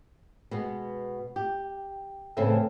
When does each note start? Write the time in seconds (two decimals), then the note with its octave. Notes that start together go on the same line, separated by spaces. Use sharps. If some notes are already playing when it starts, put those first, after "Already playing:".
0.51 B2 G#3 B3
1.36 G4
2.37 A2 C#3 E3 C4 A4 E5